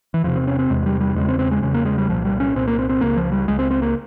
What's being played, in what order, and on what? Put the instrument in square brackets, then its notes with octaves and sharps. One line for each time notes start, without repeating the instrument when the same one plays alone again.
[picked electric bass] E3
E2 C3 F3
C4
C#4
C4
E2 C3 G#3
G3
G3
E2 C#3 G#3
C4
C4
G#3
E2 C#3 G#3
A#3
G#3
G3
C2 A#2 F3
G3
C#4
C2 A#2 C4
A#3
C4
C4
C#2 C#3 A#3
F3
G3
C#2 C#3 G#3
C4
C4
A#3